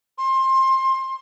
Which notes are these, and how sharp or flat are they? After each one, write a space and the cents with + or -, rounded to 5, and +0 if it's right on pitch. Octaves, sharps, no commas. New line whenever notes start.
C6 +20